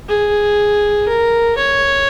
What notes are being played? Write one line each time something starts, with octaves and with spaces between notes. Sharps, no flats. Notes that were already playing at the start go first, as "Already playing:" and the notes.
G#4
A#4
C#5